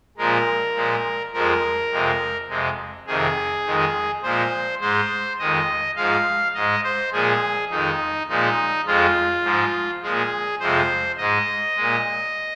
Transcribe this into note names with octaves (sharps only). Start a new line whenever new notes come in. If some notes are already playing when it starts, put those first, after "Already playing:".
A#2 F3 G#3 A#4
A#2 F3 G#3
F2 F3 G#3 A#4
F2 C3 G#3
F2 C3 G#3
F2 C3 D#3 G#4
F2 D#3 G#3
A#2 F3 G#3 C5
G#2 G#3 C5
F2 D#3 G#3 D#5
G#2 F3 G#3 F5
G#2 G#3 D#5
C5
A#2 F3 G#3 G#4
F2 D#3 G#3 D#4
A#2 F3 G#3 D#4
F2 F3 G#3 F4
G#2 F3 G#3
A#2 F3 G#3 G#4
F2 C3 F3 G#3 C5
G#2 G#3 D#5
A#2 G#3